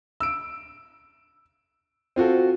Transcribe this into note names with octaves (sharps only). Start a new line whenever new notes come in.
E6 D7
C4 F4 F#4 A4